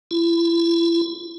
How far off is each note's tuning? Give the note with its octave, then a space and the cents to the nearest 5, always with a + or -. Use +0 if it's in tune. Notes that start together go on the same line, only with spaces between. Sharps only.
E4 +35